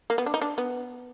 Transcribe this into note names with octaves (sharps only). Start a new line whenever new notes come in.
A#3
B3
D4
D#4
D4
B3